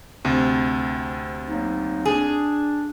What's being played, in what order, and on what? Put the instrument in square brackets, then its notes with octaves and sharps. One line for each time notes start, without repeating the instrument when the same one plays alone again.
[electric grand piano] D2 C3
[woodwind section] F#3 A#3 D#4
[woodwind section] D4 [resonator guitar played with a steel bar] G#4